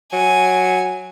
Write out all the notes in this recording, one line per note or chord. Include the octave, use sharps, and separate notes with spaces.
F#3 G#5